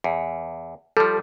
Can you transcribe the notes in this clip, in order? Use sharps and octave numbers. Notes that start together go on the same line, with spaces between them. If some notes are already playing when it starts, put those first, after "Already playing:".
E2
F3 G3 A4